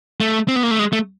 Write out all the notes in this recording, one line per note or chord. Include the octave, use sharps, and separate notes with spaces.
A3
C4
B3
A#3
A3
G#3
A3